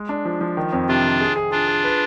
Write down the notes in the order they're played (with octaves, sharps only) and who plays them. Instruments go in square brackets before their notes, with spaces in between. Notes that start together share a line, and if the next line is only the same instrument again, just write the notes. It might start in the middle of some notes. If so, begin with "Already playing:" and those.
Already playing: [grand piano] G#3
D4
F3
F3
D#3
F2
[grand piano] C3 [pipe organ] D4 F4
[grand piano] D#3
G#4
G#4
[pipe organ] D4 F4 [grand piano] G#4
[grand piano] G#4
B4